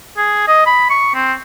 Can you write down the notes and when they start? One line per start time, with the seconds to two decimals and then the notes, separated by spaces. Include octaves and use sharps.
0.17 G#4
0.48 D#5
0.66 B5
0.90 C#6
1.15 C4